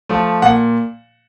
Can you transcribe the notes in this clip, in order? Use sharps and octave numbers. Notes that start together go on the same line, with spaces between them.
F3 A3
A#2 F#5